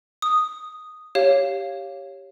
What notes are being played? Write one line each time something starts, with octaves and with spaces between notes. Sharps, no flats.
D#6
G4 C#5 F5